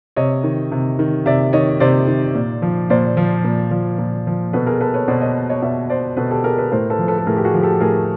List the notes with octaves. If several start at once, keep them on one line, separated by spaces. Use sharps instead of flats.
C3 C#5 D#5
D#3
C3
D#3
C3 D5 E5
D#3 C#5 D#5
C3 C5 D5
D#3
A#2
F3
A#2 C5 D5
F3
A#2
F3
A#2
F3
B2 A4 B4
G#4 A#4
A4 B4
B4 C#5
B2 C5 D5
C#5 D#5
C#5 D#5
B2 D5 E5
C5 D5
B2 A4 B4
G4 A4
G#4 A#4
A4 B4
A2 A#4 C5
A4 B4
F3
A4 B4
A4
A2 G#4 A#4
G4
F#4 G#4
F3
G4 A4
A2 G#4 A#4